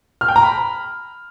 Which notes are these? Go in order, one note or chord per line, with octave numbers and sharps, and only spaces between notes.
F6
G5
A#5
B5